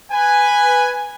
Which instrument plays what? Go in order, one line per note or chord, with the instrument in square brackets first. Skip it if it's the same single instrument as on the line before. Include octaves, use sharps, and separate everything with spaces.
[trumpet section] B4 G#5